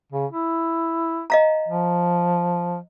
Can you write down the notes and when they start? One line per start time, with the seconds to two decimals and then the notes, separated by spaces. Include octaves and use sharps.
0.12 C#3
0.32 E4
1.30 D#5 F5 A#5
1.69 F3